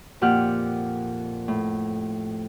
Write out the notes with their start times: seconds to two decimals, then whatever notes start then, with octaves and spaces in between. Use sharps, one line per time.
0.21 F2 A#2 G4 F#5 F6
1.48 A2